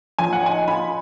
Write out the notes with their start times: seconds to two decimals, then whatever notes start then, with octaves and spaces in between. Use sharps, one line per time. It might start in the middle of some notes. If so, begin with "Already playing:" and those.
0.19 F3 G#5
0.33 F#5
0.43 D#4 G#5
0.68 F4 B5